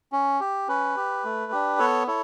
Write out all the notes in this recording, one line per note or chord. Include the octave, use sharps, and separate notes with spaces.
C#4
G4
C#4 B4
G4
A3
D4 G4
B3 A4 C#5
E4 A4 C#5